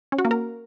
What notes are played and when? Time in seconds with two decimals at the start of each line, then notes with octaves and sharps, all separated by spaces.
0.12 C#4
0.18 F#4
0.25 A#3
0.31 A#4